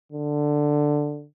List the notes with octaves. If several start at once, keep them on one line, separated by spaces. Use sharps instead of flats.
D3